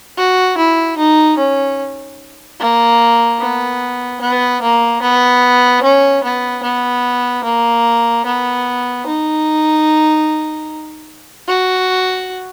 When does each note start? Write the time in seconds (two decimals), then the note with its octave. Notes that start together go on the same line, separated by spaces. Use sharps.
0.17 F#4
0.57 E4
0.98 D#4
1.38 C#4
2.60 A#3
3.40 B3
4.20 B3
4.62 A#3
5.02 B3
5.82 C#4
6.23 B3
6.63 B3
7.44 A#3
8.25 B3
9.06 D#4
11.48 F#4